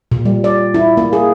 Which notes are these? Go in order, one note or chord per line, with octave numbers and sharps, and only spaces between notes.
A#2
G3
D5
E4
A#3
G#4